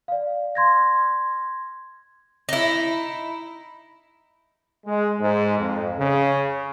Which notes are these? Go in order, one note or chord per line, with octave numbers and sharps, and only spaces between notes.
D5 F5
C6 G#6 A#6
D#4 E4
G#3
G#2
F2
C#3